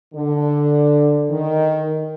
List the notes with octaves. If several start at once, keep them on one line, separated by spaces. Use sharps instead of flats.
D3
D#3